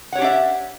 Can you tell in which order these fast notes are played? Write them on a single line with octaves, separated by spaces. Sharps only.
F#5 C#5 G4 D4 E5